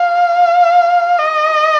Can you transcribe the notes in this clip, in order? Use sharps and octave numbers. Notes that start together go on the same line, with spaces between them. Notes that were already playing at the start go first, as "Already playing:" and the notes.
Already playing: F5
D#5